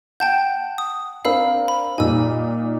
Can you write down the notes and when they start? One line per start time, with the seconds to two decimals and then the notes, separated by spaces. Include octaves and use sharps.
0.20 F#5 G5 A5 G6
0.78 D#6
1.25 C4 D4 A#4 F5 B5 E6
1.68 B5
1.98 A#2 G3 D#4 G#5 E6